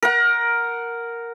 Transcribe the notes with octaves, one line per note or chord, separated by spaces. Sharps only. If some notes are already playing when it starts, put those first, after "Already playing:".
A#4 F#5